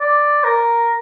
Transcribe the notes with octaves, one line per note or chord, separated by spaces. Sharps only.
D5
A#4